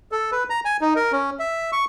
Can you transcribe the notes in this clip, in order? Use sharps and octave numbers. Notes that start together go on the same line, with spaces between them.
A4
B4
A#5
G#5
D#4
A#4
C#4
E5
C#6